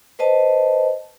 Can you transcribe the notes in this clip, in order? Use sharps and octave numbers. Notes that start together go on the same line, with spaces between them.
B4 C5 D#5 A5